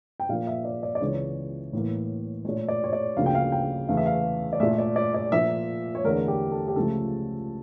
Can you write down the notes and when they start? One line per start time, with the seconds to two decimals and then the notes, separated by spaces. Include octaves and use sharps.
0.20 G5
0.29 A#2 F3 A#3 F5
0.47 E5
0.65 D5
0.83 D5
0.95 D5
1.01 C#2 C#3 E3 C#5
1.73 A2 E3 A#3
2.45 A#2 A3 C#5
2.68 D5
2.84 C#5
2.93 D5
3.17 D2 C#3 F3 A#3 F5
3.26 G5
3.35 F5
3.52 G5
3.88 E2 C#3 E3 A3 F5
3.97 E5
4.06 F5
4.53 D5
4.60 A#2 A3 E5
4.78 D5
4.96 D5
5.14 D5
5.32 A#2 F3 A#3 E5
5.95 C#5
6.04 E2 D3 A3 A#4
6.28 G4
6.52 A4
6.68 G4
6.76 C#2 C#3 F3 A3 A4